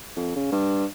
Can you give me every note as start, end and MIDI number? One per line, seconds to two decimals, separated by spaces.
0.16 0.35 41
0.36 0.51 49
0.52 0.85 43